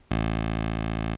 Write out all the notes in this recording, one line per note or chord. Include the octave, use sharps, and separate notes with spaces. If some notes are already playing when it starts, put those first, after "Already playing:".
A1